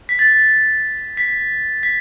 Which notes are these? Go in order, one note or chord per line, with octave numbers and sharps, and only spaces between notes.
B6
A6
B6
B6